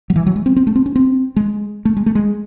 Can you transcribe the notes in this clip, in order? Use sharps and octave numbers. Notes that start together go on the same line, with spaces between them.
F#3
E3
F#3
G#3
C4
C4
A3
C4
C#4
C4
G#3
A3
G#3
A3
G#3